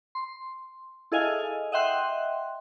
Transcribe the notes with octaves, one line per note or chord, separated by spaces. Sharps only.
C6
E4 G#4 A4 D#5 F5 G#5
D#5 E5 F#5 G5 C6 F#6